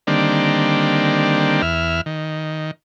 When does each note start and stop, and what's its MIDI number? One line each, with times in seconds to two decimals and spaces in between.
0.07 1.62 50
0.07 1.62 51
0.07 1.62 55
0.07 1.62 58
0.07 1.62 60
0.07 1.62 62
1.62 2.01 40
1.62 2.01 76
1.62 2.01 89
2.06 2.71 51